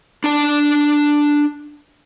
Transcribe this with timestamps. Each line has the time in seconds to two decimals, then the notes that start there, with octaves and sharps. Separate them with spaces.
0.24 D4 A5